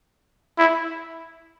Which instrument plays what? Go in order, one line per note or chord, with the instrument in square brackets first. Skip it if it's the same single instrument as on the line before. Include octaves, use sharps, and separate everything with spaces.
[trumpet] E4